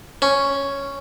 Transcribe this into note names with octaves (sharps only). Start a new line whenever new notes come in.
C#4